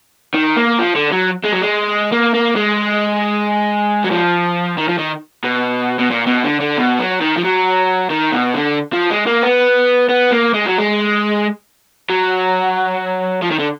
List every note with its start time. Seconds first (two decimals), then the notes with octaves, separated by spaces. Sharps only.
0.34 D#3
0.57 A#3
0.79 F3
0.95 D3
1.12 F#3
1.45 G#3
1.53 F#3
1.62 G#3
2.12 A#3
2.34 A#3
2.56 G#3
4.04 F#3
4.11 F3
4.78 D#3
4.88 F3
4.98 D#3
5.44 B2
6.00 B2
6.11 A#2
6.27 B2
6.44 D3
6.61 D3
6.78 B2
7.00 F#3
7.21 D#3
7.37 F3
7.44 F#3
8.10 D#3
8.32 B2
8.54 D3
8.93 F3
9.10 G#3
9.27 A#3
9.43 B3
10.09 B3
10.32 A#3
10.54 G#3
10.66 F#3
10.78 G#3
12.09 F#3
13.42 F3
13.51 D#3
13.60 D3